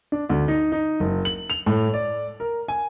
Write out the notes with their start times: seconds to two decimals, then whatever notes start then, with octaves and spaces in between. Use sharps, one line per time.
0.12 D4
0.30 D2
0.48 D#4
0.72 D#4
1.00 F#1
1.25 F#7
1.50 F7
1.66 A2
1.94 D5
2.40 A#4
2.68 G#5